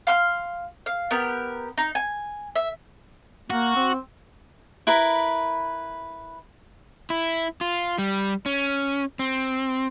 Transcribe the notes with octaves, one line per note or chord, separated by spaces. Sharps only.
F5 C6 F6
F5
B3 G4 A#4
D#4
G#5
E5
A#3 F#4
C4
E4 A#4 B4 B5
E4
F4
G3
C#4
C4